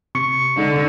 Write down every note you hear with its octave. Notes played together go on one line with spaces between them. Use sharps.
C3 C#6 C#7
D3 G#3 D#4